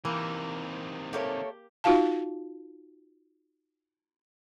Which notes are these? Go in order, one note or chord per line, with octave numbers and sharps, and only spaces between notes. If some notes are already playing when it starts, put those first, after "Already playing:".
C3 D#3 E3 A#3
A3 A#3 G4 C#5
D#4 F4 F#4 F5 A5